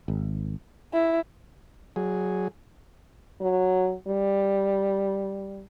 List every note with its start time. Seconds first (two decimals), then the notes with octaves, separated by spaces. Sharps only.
0.08 G#1
0.94 E4
1.96 F#3 G#4
3.41 F#3
4.08 G3